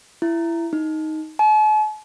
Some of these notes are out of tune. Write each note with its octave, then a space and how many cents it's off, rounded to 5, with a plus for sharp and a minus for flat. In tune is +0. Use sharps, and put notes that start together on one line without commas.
E4 +20
D#4 +5
A5 -45